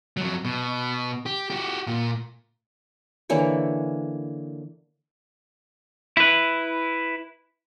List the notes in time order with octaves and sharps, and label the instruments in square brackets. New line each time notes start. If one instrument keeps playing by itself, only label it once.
[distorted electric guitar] F2 F#3
B2
G4
F#4 G4
A#2
[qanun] D3 E3 A#3 C#5
[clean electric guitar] E4 B4